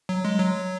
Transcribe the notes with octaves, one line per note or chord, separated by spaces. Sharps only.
F#3
G#3
F#3